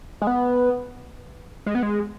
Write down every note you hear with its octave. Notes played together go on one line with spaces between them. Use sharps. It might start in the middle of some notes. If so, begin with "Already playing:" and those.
G#3
B3
G#3
B3
G#3